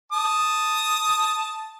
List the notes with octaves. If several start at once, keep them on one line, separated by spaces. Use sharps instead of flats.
A5 D#6